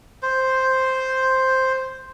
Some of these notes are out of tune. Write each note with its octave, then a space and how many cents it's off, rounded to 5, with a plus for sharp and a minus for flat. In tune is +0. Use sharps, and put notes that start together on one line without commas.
C5 +0